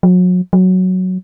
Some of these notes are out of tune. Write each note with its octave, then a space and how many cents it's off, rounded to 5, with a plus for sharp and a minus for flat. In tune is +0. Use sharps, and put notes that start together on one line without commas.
F#3 -35
F#3 +0